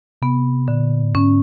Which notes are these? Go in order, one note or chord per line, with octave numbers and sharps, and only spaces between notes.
C3 B3
A#2 D3
A2
G#2 C#4